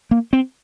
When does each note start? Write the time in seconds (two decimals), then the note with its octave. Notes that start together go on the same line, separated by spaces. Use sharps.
0.11 A#3
0.33 C4